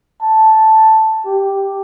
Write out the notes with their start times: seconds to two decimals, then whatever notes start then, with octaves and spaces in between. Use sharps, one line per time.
0.22 A5
1.26 G4